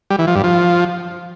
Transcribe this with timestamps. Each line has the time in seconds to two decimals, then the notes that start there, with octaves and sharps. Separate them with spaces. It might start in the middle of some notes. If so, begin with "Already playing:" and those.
0.10 G3
0.19 E3
0.27 F3
0.35 G2
0.44 F3